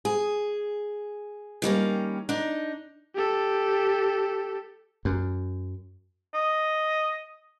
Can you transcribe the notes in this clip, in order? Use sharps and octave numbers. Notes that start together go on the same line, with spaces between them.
G#4
D#3 G3 A#3 C#4
D4 D#4
G4 A4
F#2
D#5